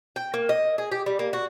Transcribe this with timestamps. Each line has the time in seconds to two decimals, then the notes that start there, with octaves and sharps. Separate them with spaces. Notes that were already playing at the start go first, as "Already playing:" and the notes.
0.16 G5
0.34 A#3
0.49 D#5
0.78 G#4
0.91 G4
1.06 G3
1.19 A#3
1.33 F#4